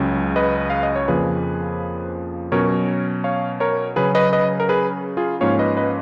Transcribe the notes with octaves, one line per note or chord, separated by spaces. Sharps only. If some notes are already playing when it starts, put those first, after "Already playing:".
Already playing: C#2 C#3 F#3 C#4
B4 D#5
F5
D#5
C#5
F2 C#3 F3 A#3 G#4 B4
B2 F#3 C#4 A#4 C#5
C#5 F5
A#4 C#5
C#3 F#3 C#4 G#4 B4
B4 D#5
B4 D#5
A#4
G#4 B4
F4 G#4
G#2 F3 A#3 C#4 C#5 F5
B4 D#5
B4 D#5